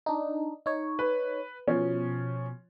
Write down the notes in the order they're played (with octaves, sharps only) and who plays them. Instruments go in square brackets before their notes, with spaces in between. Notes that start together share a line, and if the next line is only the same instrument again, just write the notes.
[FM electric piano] D4 D#4
D#4 C#5
[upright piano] B4
[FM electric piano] B2 [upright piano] F3 C#4